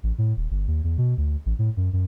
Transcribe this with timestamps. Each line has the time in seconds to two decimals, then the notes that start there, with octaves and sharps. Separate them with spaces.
0.03 A1
0.18 A2
0.37 D#1
0.51 G1
0.67 D#2
0.84 E2
0.98 B2
1.18 D2
1.46 A1
1.59 A2
1.77 F#2
1.93 F#2